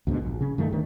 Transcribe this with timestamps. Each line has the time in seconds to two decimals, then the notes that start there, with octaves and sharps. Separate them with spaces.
0.07 D2 G#2 B2 D3
0.22 A#1
0.41 C#3 C#4
0.58 G2 D#3 A3
0.72 D2 D#3